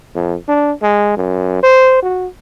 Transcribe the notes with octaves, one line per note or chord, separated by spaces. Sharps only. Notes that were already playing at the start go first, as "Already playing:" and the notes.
F2
D4
G#3
F#2
C5
F#4